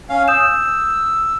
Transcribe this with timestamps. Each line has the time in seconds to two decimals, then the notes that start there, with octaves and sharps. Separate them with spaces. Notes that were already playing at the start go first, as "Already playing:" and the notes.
0.09 C#4 F5
0.28 D#6 E6 G6 E7